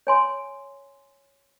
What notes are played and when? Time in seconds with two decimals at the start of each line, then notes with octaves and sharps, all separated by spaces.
0.07 C#5 G#5 C6